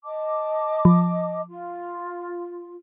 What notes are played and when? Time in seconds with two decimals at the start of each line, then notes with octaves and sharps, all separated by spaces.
0.04 D#5 A5 D6
0.85 F3
1.48 F4